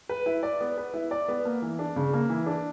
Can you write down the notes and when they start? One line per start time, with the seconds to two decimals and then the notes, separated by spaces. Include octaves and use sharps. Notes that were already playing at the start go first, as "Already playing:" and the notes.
0.09 B4
0.26 E4
0.43 D5
0.61 B3
0.78 B4
0.94 E4
1.11 D5
1.28 B3
1.45 A#3
1.62 E3
1.79 D4
1.96 C#3
2.13 A#3
2.29 E3
2.46 D4